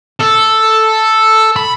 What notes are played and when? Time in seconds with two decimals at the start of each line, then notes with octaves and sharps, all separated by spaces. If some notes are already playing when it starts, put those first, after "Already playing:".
0.20 A4
1.56 B5